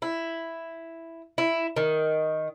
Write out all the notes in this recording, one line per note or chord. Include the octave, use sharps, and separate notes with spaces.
E4
E4
D#3